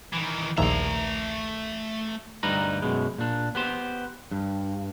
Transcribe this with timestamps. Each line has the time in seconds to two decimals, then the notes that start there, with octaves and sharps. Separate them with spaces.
0.13 D#3 E3
0.58 A#1 D#2 A3 E5 A#5
2.43 D2 G2 G3 D#4 B4 A#5
2.82 F#2 B2 G#3
3.18 A#2 D4
3.55 B3 G4 C5
4.31 G2